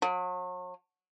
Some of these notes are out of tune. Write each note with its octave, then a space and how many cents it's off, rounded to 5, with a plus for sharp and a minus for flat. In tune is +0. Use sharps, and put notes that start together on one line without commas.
F#3 -40